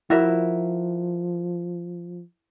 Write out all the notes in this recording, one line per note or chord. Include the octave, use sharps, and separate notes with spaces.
F3 E4 F#4 A#4 E5